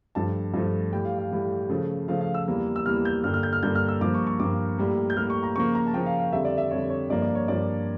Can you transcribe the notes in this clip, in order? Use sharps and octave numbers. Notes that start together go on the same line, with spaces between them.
G2 F3 A3 A5
G2 F3 A3
A2 E3 G3 G5
F5
F5
A2 E3 G3
C#3 F3 A3
C#3 F3 A3 F5
F5
E6
E2 E3 G3 A#3
E6
E2 E3 G3 A#3 F6
G6
G2 D3 G3 A#3 F6
F6
G6
F6
G2 D3 G3 A#3 G6
F6
E6
G2 F3 A#3 D6
C#6
C#6
G2 F3 A#3 D6
A2 G3 A#3
G6
A2 G3 A#3 F6
C#6
A#5
C#3 F3 A#3 C#6
A#5
A5
C#3 F3 A#3 G5
F5
F5
F2 D3 G3 E5
D5
E5
F2 D3 G3 C#5
C#5
G2 F3 A#3 D5
D5
C#5
G2 F3 A#3 D5